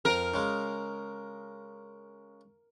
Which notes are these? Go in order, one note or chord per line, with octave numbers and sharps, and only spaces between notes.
F2 A#4
C#3 G#3